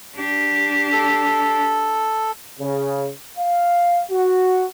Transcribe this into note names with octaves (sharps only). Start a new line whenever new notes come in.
D4 G4
A4
C#3
F5
F#4